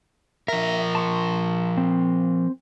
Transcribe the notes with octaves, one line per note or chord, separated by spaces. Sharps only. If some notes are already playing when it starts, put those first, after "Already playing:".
F3 A#4 E5
A5 C6 C#6
C4